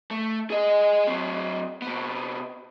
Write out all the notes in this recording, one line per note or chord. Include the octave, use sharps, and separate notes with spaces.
A3
G#4 D#5
F#3 C4
C3 B3